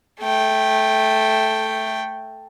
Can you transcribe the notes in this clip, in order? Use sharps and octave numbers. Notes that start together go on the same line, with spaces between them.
A3 G5